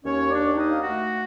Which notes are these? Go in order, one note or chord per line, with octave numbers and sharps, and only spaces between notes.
D#2 C#4 C#5
D4 D5
D#2
D#4 D#5
F5
A3 F#4 F#5